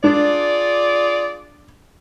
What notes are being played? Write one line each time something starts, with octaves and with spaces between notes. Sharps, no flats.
D4 F4 G#4 D5